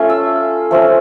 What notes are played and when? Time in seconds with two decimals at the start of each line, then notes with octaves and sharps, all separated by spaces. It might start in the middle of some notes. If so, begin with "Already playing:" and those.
Already playing: A3 C#4 F4
0.09 E5
0.71 F3 A3 C#4